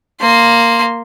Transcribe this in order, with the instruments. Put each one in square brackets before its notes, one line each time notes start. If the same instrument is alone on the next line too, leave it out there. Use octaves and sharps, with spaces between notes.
[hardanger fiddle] A#3 C6